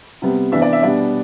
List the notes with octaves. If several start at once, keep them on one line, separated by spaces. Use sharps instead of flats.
C3 G3 B3
C3 E3 B3 D4 E5
D5
E5
B2 G3 B3 D4 D5